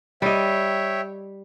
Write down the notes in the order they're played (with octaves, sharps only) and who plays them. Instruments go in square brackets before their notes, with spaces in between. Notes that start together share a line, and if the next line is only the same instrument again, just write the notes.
[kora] G3 D#5 [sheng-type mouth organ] C#5 E5 G5